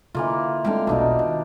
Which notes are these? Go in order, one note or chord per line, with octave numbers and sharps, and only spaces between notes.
D3 E3 A#3 F4
D3 G#3 C4 F5 G5
E1 B1 B2 D4 D#4
D#3